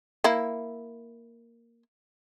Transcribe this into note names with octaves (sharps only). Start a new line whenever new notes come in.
A#3 E4